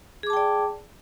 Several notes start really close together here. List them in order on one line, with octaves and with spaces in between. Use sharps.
G#4 D6 A5 G5 D5